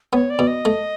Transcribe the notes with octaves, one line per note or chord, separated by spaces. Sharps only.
B3 C#5
D5
B2
D#5
A3